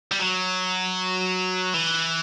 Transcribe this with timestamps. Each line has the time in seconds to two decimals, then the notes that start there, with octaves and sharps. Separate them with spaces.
0.11 G3
0.19 F#3
1.74 E3